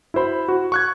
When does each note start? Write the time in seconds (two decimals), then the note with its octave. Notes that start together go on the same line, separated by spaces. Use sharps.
0.14 E4 F#4 C5 B5
0.48 F#4
0.72 C#6 F#6 G#6